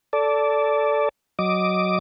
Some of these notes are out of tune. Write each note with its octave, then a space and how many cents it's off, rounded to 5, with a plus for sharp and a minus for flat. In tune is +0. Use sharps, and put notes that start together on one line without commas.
A4 +0 D5 -15
F#3 +0 D#5 +0 D6 +0